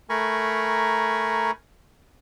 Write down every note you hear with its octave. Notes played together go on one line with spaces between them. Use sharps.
A3 A#4 G#5 A#5 B5 C#6